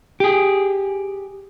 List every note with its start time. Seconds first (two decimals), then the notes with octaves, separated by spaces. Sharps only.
0.20 G4 G#4